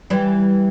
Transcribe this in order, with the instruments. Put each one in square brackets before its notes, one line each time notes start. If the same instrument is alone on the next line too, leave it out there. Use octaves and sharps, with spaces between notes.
[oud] E3 G3